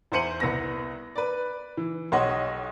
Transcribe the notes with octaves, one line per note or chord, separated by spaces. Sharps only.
E2 E4 C5 C#7 D#7 F#7
C2 B3 A#6
B4 D5
E3
B1 G4 C#5 D#5 F#5 C6